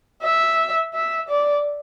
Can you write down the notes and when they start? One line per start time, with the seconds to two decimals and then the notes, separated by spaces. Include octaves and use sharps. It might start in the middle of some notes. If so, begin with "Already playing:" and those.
0.22 E5
0.94 E5
1.28 D5